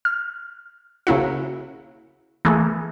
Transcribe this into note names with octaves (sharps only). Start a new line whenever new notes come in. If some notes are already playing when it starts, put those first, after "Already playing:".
F6
C#3 A#3 E4 F#4
E3 A3 A#3 G#4